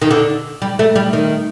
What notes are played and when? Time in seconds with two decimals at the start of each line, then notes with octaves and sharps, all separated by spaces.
0.02 D#3
0.11 D3
0.62 G3
0.79 A3
0.96 G3
1.13 D#3